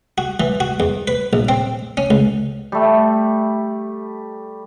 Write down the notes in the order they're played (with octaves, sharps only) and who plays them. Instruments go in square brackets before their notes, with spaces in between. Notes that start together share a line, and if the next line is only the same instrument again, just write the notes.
[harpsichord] F#4
E3
F#4
E2
B4
A#1
C4
C#4
C#2
[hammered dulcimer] G3 A3